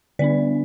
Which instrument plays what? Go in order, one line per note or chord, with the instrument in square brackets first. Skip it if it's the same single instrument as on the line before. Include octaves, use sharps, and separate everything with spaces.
[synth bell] D3 G3 B3 D4 D5